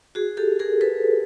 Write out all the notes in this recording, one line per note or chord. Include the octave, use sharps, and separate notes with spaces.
F#4 G#4
G4 A4
G#4 A#4
A4 B4